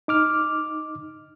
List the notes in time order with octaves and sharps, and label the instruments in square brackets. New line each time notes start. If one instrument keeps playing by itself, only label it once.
[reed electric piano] D#4 D6 F6